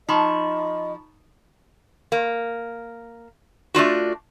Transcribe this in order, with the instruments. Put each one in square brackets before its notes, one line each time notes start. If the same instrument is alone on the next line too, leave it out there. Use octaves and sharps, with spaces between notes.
[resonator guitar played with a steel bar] F3 [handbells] D#4 B5 C#6 [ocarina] D#5
[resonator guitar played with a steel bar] A#3
A3 D4 F4 F#4